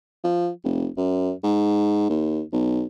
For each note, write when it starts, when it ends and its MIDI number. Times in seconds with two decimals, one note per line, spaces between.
0.24 0.49 53
0.64 0.87 29
0.97 1.31 42
1.43 2.07 44
2.10 2.41 39
2.52 2.84 35